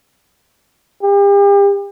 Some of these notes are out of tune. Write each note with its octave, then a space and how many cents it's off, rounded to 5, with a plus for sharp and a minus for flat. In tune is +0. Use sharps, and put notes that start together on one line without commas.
G4 +40